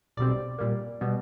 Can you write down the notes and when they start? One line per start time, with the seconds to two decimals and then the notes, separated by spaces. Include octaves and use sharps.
0.17 B1 B2 G3 C4 D5
0.58 A#2 G3 A#3
1.01 B2 G3 B3